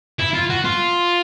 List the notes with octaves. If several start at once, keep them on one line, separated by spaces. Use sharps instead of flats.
E4
F4
F#4
F4